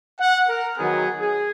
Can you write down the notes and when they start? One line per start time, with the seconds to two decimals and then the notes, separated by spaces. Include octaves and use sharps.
0.20 F#5
0.48 A#4
0.78 D#3 F#3 B3 G#4
1.20 G#4